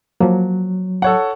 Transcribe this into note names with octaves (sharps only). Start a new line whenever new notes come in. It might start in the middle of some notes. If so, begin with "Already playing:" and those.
F3 F#3 A#3
A4 C#5 F#5